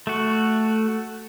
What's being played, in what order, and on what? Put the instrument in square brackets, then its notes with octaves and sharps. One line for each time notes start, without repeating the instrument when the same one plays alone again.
[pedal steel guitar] A3 F#4